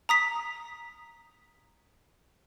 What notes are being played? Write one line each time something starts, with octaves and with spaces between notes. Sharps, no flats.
A#5 D#6 B6